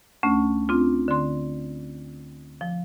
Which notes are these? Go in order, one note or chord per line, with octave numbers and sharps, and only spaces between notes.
D2 A3 C#4
C4 D4 F4
D3 C6
F3